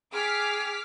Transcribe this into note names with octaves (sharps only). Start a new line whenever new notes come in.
G#4 G5 D6 F6 G#6 B6